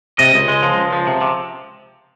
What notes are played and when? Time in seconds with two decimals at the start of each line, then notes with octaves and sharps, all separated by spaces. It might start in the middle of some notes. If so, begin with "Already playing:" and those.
0.19 C3 D#5
0.34 C#2
0.48 G#3
0.63 F3
0.78 C#2
0.93 F3
1.07 C3
1.21 C3